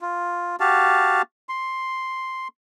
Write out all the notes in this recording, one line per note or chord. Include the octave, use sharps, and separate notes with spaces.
F4
F#4 G4 F5 A5
C6